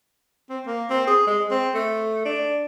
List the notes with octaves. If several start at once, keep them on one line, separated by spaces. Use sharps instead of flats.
C4
A#3
C4
G#4
G#3
C4
A3
D4